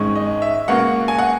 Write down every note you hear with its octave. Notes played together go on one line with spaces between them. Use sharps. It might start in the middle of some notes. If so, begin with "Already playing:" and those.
Already playing: G#1 G#2 D#3 G#3 C#4
D#5
E5
C#2 B2 A#3 C#4 F#5
G#5
F#5